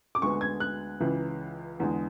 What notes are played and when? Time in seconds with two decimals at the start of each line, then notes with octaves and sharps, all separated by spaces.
0.15 D6
0.22 D2 D3 G#3 B3 C#6
0.41 G#6
0.60 F#6
1.00 C#2 C#3 E3
1.80 E2 D3 G#3